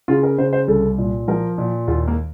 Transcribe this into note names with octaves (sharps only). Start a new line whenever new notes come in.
C#3 F4
A#4
C#3 C5
C5
C2 A4
A#2
F3 A#4
A#2
D#2 F4
A#3